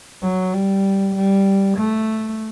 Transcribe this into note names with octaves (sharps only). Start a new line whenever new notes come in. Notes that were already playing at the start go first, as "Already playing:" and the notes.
F#3
G3
G3
A3